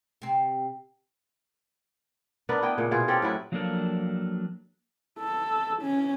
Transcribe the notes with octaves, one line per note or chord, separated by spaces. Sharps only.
C3 C4
B3 D4 A#4 B4
B3 E4 D#5 G5
A#2 C#3
B2 E4 F4 G#4
C4 C#4 G4 A4
A2 F#3 E4 B4
F3 F#3 A#3 D4 A4 A#4
A4
C#4